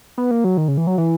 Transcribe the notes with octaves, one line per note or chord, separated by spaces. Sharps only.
B3
A#3
F#3
D#3
C#3
E3
F#3
E3